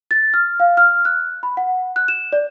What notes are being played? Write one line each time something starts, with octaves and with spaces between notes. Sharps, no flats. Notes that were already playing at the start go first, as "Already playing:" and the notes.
A6
F6
F5
F6
F#6
B5
F#5
F#6
E7
D5